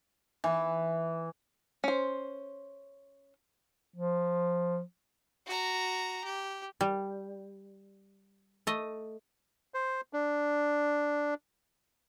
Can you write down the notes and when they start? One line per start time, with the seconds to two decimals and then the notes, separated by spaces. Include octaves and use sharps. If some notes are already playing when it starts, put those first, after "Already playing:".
0.44 E3
1.84 C#4 C5
3.96 F3
5.46 F#4 A#5
6.24 G4
6.81 G3
8.67 A3 D#5
9.74 C5
10.13 D4